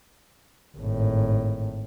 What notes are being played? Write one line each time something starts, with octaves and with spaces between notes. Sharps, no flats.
G#1 A2